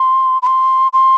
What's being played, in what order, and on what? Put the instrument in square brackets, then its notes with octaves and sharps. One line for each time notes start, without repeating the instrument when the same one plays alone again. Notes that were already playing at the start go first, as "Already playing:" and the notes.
Already playing: [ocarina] C6
B5
C6
C6